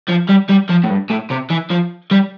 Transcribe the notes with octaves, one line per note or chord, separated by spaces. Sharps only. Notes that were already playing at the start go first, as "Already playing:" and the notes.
F3
G3
G3
F3
A2
G2
A2
C3
E3
F3
G3